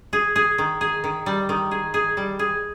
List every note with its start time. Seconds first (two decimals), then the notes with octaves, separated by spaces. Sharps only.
0.13 G#4
0.36 G#4
0.58 D#3
0.81 G#4
1.04 D#3
1.26 G3
1.49 D#3
1.71 G#4
1.94 G#4
2.17 G3
2.39 G#4